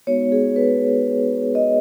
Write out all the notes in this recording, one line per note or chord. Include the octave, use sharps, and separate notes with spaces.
G#3 B3 D#4 F#4 C#5
G#4
B4
D#5